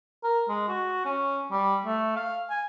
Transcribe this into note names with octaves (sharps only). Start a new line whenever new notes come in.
A#4
G#3
F#4
C#4
G3
A3
F5
G#5